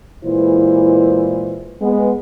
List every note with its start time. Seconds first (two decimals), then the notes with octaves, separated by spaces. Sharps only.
0.24 A#2 E3 G#3 E4 B4 C5
1.82 G#3 B3